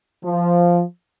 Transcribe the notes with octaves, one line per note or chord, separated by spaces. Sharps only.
F3